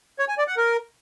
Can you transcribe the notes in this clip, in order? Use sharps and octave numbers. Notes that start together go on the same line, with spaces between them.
C#5
G#5
D5
F#5
A#4